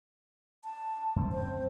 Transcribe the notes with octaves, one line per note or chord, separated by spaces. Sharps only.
A5
F#2 C4
C5